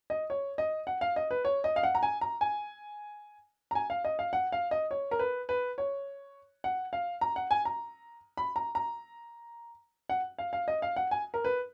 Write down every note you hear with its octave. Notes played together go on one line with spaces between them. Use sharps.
D#5
C#5
D#5
F#5
F5
D#5
B4
C#5
D#5
F5
F#5
A#5
G#5
A#5
G#5
A#5
G#5
F5
D#5
F5
F#5
F5
D#5
C#5
A#4
B4
B4
C#5
F#5
F5
A#5
F#5
G#5
A#5
B5
A#5
A#5
F#5
F5
F5
D#5
F5
F#5
G#5
A#4
B4